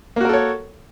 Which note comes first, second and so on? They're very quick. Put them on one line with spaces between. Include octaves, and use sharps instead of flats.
A#3 F#4 A#4 A4 C#5